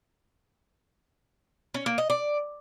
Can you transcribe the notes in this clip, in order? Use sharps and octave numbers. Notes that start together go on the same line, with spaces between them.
C#4
A#3
D#5
D5